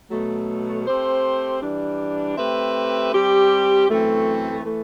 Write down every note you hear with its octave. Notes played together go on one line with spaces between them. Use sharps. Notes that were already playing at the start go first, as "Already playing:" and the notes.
B2 F#3 A3
A3 C4 G4 C5
E3 G3 D4
A3 C4 G4 B4 E5
G3 C4 G4
F#2 E3 A3 C4
E3 A3